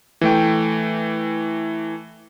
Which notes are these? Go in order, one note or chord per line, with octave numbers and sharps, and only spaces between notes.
E3 A3 G5